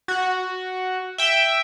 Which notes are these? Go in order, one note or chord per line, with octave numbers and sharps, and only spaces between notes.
F#4
E5 G5